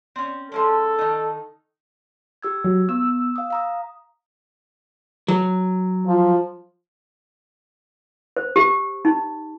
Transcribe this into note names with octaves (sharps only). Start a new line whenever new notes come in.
C4 C#4
F3 G#3 C#4 A4
D#3 D#4
G4 E6 G#6
F#3
B3 E6
F5 D#6
F5 A#5 D#6
F#3
F3
C5
G4
D#4